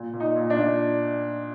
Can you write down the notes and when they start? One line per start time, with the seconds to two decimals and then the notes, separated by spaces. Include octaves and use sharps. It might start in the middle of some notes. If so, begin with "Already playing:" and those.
Already playing: A#2
0.13 A#2
0.20 D#4
0.36 A#2
0.50 D4
0.57 A#2